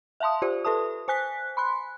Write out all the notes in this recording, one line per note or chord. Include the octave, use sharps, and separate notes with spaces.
E5 F5 A5 C6 D#6
F4 G4 C5 D5
A4 B4 E5 A5 D#6
C5 G#5 F#6 B6
B5 C6 F#6